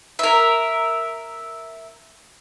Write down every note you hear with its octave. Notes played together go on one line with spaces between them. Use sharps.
A#4 E5